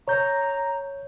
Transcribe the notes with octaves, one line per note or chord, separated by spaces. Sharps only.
C#5 A#5 G6